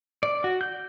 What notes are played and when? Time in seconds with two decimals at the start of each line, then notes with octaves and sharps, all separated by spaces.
0.23 D5
0.44 F#4
0.61 G6